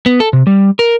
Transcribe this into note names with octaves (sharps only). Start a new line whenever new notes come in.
B3
A4
C3
G3
A#4